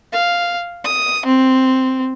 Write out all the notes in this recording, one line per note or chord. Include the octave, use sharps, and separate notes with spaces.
F5
D#6
C4